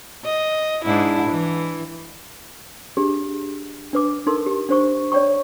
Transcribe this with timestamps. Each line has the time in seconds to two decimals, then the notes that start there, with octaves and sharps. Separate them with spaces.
0.24 D#5
0.84 G#2 D4 E4
1.30 E3
2.97 D4 G4 G#4
3.93 D4 B4 D6
4.27 D#4 A4 A#4 C6
4.46 G4
4.69 D4 C5 C#6
5.12 C#5 D5 G5 A#5 C#6